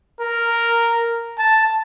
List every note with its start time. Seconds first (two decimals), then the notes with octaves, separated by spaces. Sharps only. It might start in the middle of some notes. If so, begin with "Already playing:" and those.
0.21 A#4
1.38 A5